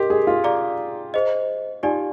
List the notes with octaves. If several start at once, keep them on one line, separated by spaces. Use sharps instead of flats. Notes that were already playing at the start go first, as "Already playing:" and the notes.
Already playing: G4 A#4 D#5 G5 C6
G#4
F4
G#4 D5 F5 A#5 D6
G#4 C5 D#5
D#4 F4 G4 D5 G#5